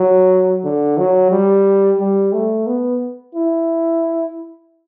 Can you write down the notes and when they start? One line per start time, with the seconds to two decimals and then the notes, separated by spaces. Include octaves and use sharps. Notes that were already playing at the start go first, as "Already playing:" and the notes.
Already playing: F#3
0.64 D3
0.98 F#3
1.31 G3
2.00 G3
2.33 A3
2.67 B3
3.35 E4